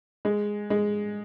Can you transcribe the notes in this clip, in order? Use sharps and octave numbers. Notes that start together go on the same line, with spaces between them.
G#3
G#3